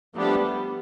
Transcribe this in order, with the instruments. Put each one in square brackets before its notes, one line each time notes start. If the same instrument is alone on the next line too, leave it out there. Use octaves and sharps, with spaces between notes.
[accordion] F3 A3 D4 G4 [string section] G3 B3